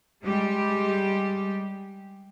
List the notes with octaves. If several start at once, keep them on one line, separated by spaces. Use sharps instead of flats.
G3 G#3 G4